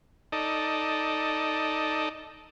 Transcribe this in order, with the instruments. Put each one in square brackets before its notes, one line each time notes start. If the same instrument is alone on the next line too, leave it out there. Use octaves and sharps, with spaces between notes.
[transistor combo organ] D#4 A4 D5 D#5